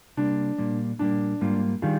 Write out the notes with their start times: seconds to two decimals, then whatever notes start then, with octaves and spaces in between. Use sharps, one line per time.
0.17 C3 G3 A#3 D4
0.58 A#2 G3 A#3
0.99 A#2 G3 A#3 D4
1.41 G#2 G3 A#3 F4
1.82 D#3 G3 D4 F4 G#4